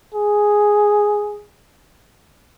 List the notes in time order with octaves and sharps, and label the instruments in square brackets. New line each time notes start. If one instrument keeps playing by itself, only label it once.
[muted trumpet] G#4